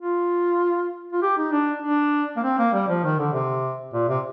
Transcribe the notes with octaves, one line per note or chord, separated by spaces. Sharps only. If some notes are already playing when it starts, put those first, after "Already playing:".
F4
F4
G4
D#4
D4
D4
A#3
C4
A#3
G3
F3
D#3
D3
C3
A#2
C3